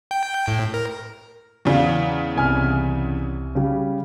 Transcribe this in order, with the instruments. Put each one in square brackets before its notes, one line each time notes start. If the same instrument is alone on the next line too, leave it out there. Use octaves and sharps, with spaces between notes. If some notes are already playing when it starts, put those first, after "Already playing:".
[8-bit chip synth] G5
A2
A#4
[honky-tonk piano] E2 C#3 [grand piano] D5 F5
[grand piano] C2 G#5 F6
C#3 G3